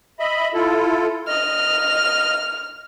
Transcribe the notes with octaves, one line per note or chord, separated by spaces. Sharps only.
D#5 E5 B5
E4 F4 A4
D#5 F6